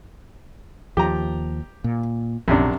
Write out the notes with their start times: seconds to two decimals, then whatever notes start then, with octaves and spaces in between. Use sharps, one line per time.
0.97 D#2 F3 G4 A#5
1.84 A#2
2.48 A#1 F#2 C3 D4